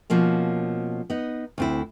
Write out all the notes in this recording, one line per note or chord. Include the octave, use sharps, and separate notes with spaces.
B2 F3 A#3 C#4
B3 D#4
D2 C4 E4